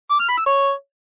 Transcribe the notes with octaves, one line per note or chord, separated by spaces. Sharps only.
D6
F6
B5
E6
C#5